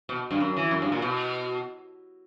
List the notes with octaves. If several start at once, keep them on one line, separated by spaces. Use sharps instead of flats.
B2
G2
F#2
E3
F#2
G2
A#2
B2